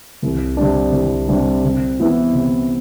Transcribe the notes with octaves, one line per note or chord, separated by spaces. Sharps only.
C2
C3 G3 D4
C2
C3 G3 D4
C3
E3 B3 E4
C3